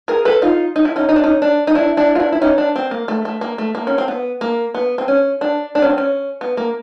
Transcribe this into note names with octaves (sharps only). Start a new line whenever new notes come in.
G#4 A#4
A4 B4
D#4 F4
D#4
E4
C#4 D#4
D#4
D4
C#4 D#4
D4
D#4
D4 E4
D4 E4
F4
D4 E4
E4
C#4 D#4
D4
C4
A#3
A3
A3
A#3
A3
A#3
C#4
C4
B3
A#3
B3
C4
C#4
D4
D4
C#4
C4
C#4
B3
A#3